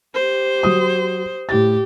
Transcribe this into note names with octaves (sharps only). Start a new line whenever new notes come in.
G4 C5
F#3 D#6
A2 G4 A6